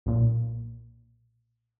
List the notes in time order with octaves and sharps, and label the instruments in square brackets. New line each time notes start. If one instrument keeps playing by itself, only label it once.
[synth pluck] B1 A#2